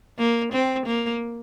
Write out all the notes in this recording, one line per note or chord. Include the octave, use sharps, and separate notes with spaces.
A#3
C4
A#3